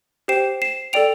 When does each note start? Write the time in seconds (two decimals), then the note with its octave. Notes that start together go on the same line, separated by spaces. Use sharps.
0.28 G4 C5 G5 C7 E7
0.62 C7 E7
0.93 A4 D5 G5 D7 F7